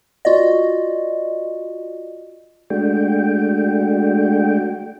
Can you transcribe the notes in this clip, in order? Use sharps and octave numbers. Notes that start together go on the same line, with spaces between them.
F4 F#4 D5 D#5
G#3 A3 D4 F#4 G5